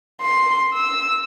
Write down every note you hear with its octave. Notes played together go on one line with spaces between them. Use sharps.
C6
E6